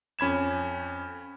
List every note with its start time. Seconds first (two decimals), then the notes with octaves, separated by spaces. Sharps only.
0.19 F2 C#4 B5 G#6 E7